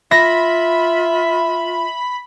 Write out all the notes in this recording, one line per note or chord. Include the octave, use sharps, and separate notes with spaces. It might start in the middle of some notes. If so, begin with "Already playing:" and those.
F4 E5 B5 A#6